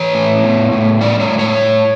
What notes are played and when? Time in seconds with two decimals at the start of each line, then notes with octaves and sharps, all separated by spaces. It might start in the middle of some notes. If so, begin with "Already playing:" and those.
Already playing: E3 C#5
0.15 A2
0.43 B3
0.72 A2
1.01 G3 D5
1.20 C#5
1.30 A2
1.39 C#5